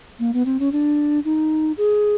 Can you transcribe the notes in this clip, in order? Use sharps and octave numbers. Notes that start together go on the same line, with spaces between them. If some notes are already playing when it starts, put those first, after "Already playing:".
A#3
B3
C4
C#4
D4
D#4
G#4